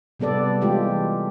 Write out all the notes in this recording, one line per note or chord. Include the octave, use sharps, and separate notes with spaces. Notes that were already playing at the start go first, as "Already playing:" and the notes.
C3 G3 B3 A4 D5
E3 G#3 A3 F4 G4